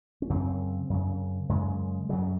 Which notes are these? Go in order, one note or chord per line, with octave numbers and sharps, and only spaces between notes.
C#4
F#2 C#3 C4
F#2 C#3
F#2 C#3 G#3
F#2 C#3 F#3